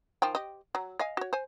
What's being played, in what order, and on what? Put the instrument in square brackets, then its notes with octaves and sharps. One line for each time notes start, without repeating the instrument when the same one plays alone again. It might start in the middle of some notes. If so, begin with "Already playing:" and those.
[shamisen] D#3 F3 G5
G4 D#5
F#3
D#5 F5 G#5
F#4 C#5
C5 G#5